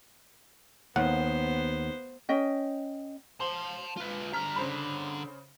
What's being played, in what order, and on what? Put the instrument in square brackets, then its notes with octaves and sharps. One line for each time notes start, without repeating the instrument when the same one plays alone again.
[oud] D#2 [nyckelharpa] B3 C5 [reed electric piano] F#5
[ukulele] C#4 D#5 G5
[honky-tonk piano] C5 [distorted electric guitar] A5 C6
[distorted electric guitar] F4 B4
[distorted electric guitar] D3 A#5 [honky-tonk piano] F6 B6
[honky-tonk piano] C#3 C5 B5